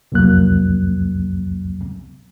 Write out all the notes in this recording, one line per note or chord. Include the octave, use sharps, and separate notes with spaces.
C2 F2 F#3 A#3 F#6